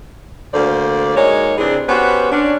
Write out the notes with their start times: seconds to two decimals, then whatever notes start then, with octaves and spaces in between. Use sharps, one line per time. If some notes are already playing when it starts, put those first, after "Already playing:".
0.53 D2 D3 A#3 C5 D5
1.17 G#3 A#3 D#4 F#4 C#5
1.57 C3 E3 C4 D4 G#4
1.89 B3 C#4 F#4 G4 B4 C5
2.32 C#4 D4